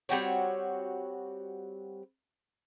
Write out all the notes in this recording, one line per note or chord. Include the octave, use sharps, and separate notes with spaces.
G3 C4 F#4 C#5